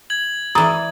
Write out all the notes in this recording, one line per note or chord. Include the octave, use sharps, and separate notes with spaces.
G#6 F#7
E3 D5 A#5 D#6